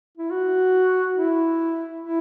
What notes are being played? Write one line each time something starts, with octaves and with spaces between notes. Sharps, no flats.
E4
F#4
E4
E4